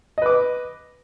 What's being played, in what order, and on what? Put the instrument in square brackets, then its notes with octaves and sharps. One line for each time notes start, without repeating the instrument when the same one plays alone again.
[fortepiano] D#5
B4
D6